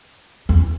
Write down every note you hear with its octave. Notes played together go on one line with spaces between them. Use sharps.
E2